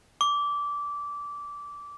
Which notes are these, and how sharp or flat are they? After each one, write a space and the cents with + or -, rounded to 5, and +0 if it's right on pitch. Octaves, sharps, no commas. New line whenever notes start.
D6 -20